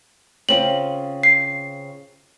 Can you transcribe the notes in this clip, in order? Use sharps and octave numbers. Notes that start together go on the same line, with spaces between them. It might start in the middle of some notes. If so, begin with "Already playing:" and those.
C#3 C4 F4 F#7
C7